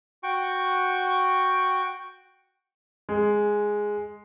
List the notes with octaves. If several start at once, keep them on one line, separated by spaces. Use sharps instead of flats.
F#4 G5 C#6
G#3